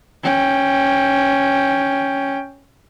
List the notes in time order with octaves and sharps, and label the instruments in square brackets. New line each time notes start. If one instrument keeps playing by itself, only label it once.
[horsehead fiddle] C#4 G5